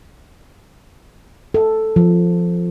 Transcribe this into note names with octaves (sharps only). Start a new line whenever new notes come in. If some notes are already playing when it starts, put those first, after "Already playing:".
A4
F3